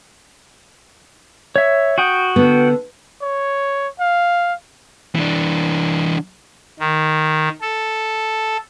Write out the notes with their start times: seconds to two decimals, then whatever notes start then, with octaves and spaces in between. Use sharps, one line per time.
1.56 C#5 E5
1.98 F#4 G5 D#6
2.36 D3 B3 A4
3.22 C#5
4.00 F5
5.15 E3 D4
6.79 D#3
7.61 A4